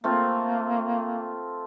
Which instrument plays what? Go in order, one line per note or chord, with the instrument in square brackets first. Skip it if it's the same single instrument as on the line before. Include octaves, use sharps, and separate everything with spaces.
[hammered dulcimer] A3 C4 F4 [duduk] A#3